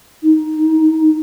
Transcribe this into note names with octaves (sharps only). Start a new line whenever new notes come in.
D#4